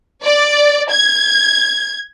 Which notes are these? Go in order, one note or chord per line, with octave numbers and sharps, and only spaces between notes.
D5
G#6